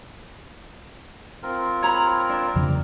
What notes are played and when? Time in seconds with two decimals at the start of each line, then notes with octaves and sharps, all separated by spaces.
1.43 C4 F4 A#4
1.82 C#5 A#5 B5
2.29 D4
2.55 F2 C#3 F3